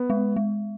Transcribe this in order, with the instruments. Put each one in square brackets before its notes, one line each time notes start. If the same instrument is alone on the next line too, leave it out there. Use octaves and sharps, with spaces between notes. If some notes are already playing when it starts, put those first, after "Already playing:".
Already playing: [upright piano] B3
[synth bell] G#3
G#3